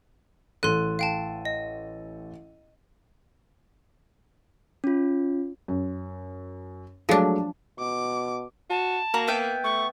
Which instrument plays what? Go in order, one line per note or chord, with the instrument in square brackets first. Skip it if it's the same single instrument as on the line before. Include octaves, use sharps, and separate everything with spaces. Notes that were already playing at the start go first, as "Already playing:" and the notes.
[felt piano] A1 A4 D#7 [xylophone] C6 F#6
[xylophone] F5 G5 A5
D#5
[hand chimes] C#4 F4
[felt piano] F#2
[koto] F3 D4 [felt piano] F#3 G#3 A3
[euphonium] B2 [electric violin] D6
[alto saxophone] F#4 [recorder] A5
[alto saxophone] A#3 [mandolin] F#4 A#5
[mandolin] B3 E5 G5
[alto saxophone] A3 [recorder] C#6